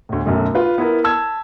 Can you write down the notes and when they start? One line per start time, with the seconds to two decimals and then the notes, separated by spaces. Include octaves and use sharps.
0.09 D2 A2
0.25 B1 F#2 A3
0.55 F4 B4
0.78 B3 E4 A#4
1.04 A5 E6 G#6